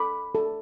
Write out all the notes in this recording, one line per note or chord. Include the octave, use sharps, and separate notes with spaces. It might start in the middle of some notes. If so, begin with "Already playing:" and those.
Already playing: A4 B5 D6
A4